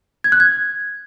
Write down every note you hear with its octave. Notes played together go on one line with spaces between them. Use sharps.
G#6
F#6
G#6